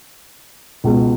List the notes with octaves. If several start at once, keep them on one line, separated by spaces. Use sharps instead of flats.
C#2 B2 G#3